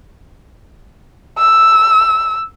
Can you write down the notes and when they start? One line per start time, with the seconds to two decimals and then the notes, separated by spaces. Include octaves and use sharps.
1.38 E6